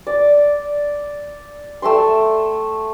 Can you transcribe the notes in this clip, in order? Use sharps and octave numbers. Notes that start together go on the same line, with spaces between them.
D5
A3 E5 G5 C6